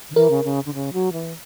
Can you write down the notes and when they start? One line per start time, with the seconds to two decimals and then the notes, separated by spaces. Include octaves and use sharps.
0.10 D3
0.15 E3 A#4
0.30 C#3
0.45 C#3
0.66 D3
0.74 C#3
0.93 F#3
1.12 E3